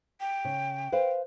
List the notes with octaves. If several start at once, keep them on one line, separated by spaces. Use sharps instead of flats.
G5
C#3
B4 C5 F5